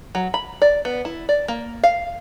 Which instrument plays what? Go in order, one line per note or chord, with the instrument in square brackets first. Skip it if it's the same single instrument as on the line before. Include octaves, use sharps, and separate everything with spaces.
[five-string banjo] F#3
B5
D5
B3
E4
D5
A#3
F5